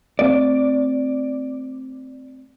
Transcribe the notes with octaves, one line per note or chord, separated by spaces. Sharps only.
A3 C4 D5